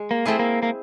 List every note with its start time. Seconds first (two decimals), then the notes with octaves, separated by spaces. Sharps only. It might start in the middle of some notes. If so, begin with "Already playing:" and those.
Already playing: G#3
0.11 A#3
0.26 A3 C4 E4 G#4
0.39 A#3
0.63 A#3